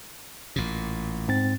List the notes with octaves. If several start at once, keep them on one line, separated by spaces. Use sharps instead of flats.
A1 A#2
G#2 C4 A6